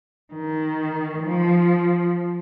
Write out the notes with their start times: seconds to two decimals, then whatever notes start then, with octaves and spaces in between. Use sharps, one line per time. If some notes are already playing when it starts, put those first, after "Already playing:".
0.34 D#3
1.24 F3